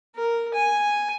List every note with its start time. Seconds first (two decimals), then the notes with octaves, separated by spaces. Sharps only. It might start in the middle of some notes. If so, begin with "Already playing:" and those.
0.16 A#4
0.54 G#5